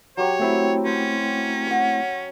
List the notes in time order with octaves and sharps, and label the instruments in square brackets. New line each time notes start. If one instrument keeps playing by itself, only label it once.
[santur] F#3 G4 C#6 [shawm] C#5
[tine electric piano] A3 C4 E4
[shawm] C#4 [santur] C5
[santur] C#5 F#5